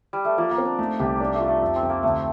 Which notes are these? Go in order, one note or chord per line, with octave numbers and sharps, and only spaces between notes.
G3
A3
F3 A#3
A#3
C4
D4
A3 D#4
C2 G4
D4
A3
F4
A3
F2
C4
F2
A#3
D2 A3